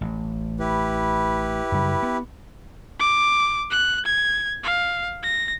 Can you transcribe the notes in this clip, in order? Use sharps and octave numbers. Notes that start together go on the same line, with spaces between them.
A1
E4 G4 B4
F#2 C#3 G3
B3
D6
F#6
G#6
F5
A#6